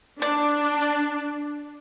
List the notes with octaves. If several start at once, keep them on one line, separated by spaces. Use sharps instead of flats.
D4 D5